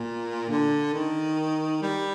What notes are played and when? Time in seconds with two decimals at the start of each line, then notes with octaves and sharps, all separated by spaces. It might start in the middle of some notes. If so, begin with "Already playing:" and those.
Already playing: A#2
0.49 D3
0.94 D#3
1.82 G3